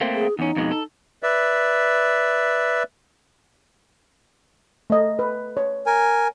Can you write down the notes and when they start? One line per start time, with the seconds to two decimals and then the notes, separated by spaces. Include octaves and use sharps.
0.01 A3 A#3 C4
0.14 G#4
0.39 E2 C#4 D#4
0.56 F2 B2 G#3
0.71 A4
1.23 B4 D5 E5
4.90 A3 D#5
5.19 B4
5.57 C#5
5.86 A#4 G#5